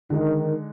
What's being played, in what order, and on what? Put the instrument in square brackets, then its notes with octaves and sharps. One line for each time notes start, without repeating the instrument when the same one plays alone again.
[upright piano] D3 G#3 D#4 [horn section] D#3